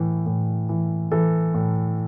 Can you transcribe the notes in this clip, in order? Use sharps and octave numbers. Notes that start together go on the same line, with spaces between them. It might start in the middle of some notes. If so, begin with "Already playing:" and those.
Already playing: A2 E3
A2
E3
E3 A4
A2